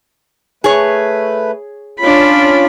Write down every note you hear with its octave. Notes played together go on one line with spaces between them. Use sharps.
A3 G#4 B4 C#5
C#4 D4 F4 B5